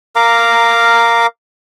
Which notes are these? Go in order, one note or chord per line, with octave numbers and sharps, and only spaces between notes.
A#4 F5 A#5 D6